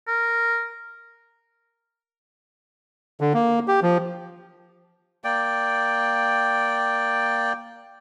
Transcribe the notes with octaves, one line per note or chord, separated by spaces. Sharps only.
A#4
D3
A#3
G4
F3
A#3 D5 G5